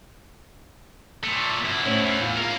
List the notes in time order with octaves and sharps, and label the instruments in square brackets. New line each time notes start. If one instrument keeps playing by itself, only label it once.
[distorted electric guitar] A#2 A3
F#2 E4
[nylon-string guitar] A2 C#4 C5
[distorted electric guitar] E2
[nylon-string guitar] F4
[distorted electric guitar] A#3 A#4